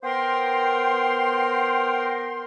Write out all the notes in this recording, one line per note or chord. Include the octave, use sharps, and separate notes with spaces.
B3 A#4 C5 G5 C6